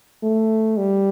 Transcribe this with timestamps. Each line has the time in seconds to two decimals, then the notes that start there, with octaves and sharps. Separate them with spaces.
0.23 A3
0.77 G3